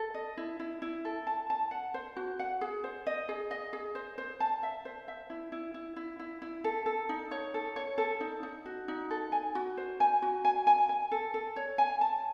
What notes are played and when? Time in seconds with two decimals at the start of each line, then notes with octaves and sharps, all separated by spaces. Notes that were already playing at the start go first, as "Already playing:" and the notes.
Already playing: A4
0.14 D#5
0.37 E4
0.60 E4
0.82 E4
1.05 A4
1.27 A5
1.50 A5
1.71 F#5
1.94 C5
2.17 F#4
2.39 F#5
2.61 G#4
2.84 C5
3.07 D#5
3.29 G#4
3.51 D#5
3.73 G#4
3.95 C5
4.18 C5
4.40 A5
4.63 E5
4.85 C5
5.08 E5
5.30 E4
5.52 E4
5.74 E4
5.96 E4
6.19 E4
6.42 E4
6.64 A4
6.86 A4
7.09 D#4
7.31 C#5
7.54 A4
7.76 C#5
7.98 A4
8.21 D#4
8.43 D#4
8.66 F#4
8.88 D#4
9.11 A4
9.32 G#5
9.55 F#4
9.77 C5
10.00 G#5
10.22 F#4
10.45 G#5
10.67 G#5
10.89 G#5
11.12 A4
11.34 A4
11.56 C#5
11.78 G#5
12.01 A5